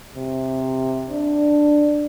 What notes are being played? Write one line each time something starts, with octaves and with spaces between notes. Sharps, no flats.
C3
D4